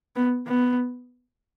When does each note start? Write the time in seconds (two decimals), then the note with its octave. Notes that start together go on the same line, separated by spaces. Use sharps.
0.16 B3
0.47 B3